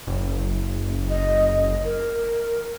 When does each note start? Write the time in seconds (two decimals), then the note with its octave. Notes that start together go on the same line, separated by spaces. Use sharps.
0.07 F#1
1.10 D#5
1.84 A#4